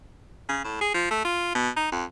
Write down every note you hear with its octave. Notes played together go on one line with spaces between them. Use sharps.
C#3
A2
G#4
F3
A3
F4
B2
D#4
F2